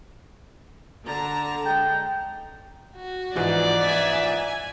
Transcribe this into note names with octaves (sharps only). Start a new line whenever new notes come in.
D3 A5 A#5
G#3 G5
F#4
G#2 E3 F3 D5
E5 G#5
G#5